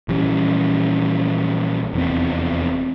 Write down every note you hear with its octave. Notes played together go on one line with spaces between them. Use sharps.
A#1 E3 G3 C#4
F1 E2 C4